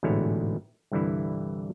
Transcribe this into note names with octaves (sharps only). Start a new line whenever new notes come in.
A1 G#2 B2 D3 E4 C#5
C2 G2 D3 E3 E4